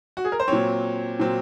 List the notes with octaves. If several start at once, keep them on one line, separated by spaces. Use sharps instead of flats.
F#4
G#4
A#4
C5
A#2 F#3 C4 C#5
A#2 F#3 C4